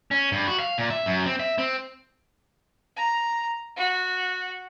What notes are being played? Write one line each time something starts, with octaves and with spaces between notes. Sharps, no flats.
C#4
G2
F#4
F5
A#2
E5
F#2
C4
E5
C4
A#5
F#4